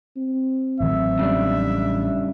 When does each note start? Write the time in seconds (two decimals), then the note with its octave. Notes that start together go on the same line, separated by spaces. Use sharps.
0.17 C4
0.80 A1 D#3 F#3 E5
1.19 C#3 G3 D4